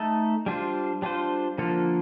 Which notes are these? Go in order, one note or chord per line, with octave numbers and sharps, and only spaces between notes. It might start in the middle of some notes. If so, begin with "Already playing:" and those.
Already playing: A3 D#4 A4
G3 D4 F4 C5
G3 D4 F4 C5
D3 F3 A#3 F4 A4